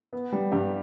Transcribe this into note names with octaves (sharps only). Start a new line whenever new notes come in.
B3
G3
G2 G4